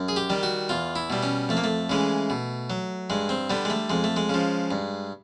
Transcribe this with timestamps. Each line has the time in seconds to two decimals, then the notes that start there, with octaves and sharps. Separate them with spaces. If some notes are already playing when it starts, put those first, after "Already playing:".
Already playing: F#2
0.08 G#4
0.16 G4
0.30 D#3 G3
0.43 F#4
0.69 E2 F4
0.96 E4
1.10 B2 G3
1.23 C#4
1.49 F2 A3
1.57 A#3
1.64 A3
1.89 C#3 E3 G#3
2.30 B2
2.70 F#3
3.10 G2 G#3
3.29 C4
3.50 D3 G3 B3
3.65 G#3
3.70 A3
3.90 F2 G#3
4.04 A3
4.16 G#3
4.29 C#3 F3
4.71 G2